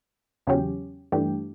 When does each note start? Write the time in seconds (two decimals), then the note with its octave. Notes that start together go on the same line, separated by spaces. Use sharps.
0.47 E2 C#3 F#3 C#4 G4
1.12 G2 E3 A3 D4 G4